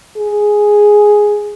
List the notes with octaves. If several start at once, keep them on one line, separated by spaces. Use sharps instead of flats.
G#4